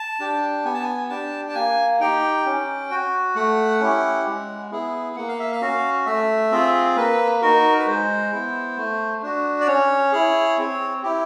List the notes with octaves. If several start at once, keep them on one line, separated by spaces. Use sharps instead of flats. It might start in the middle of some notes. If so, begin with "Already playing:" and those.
Already playing: A5
D4 G4
B3 G#5
A5
G#5
D4 G4 A5
A5
A#3 G#5
D#4 G4 G5
C#4
F#4
A3 F#5
C#4 E4 G4
G#3
B3 E4 G#4
A#3 F#5
F5
E5
F5
C#4 F#4
A3 E5
C4 F4 G#4
A#3 B4
D#4 F#4 A#4
B4
G#3 C5
B3 E4
A3
D4 F#4
D5
C#4 C#5
E4 G#4
C4
E4 G4